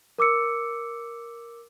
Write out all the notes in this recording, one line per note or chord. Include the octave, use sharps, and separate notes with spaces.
A#4 D6 E6 C#7